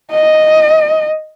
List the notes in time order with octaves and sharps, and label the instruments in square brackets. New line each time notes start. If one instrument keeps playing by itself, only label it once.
[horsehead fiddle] D#5